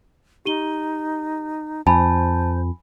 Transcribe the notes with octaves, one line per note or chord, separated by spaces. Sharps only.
D#4 G4 D#7 G7
F2 C5 G#5 A5 B5